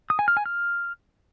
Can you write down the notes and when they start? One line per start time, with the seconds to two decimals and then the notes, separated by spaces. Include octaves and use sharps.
0.10 D#6
0.19 G#5
0.28 F6
0.37 G#5
0.46 F6